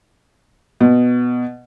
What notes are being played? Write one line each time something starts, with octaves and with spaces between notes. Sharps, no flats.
B2